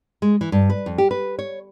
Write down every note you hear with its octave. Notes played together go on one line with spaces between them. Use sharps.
G#3
E3
G2
B4
F2
G4
B4
C#5